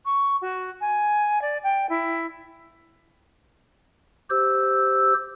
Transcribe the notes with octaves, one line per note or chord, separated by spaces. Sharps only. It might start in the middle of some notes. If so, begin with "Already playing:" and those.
C#6
F#4
G#5
D5
G5
E4
G4 C5 E6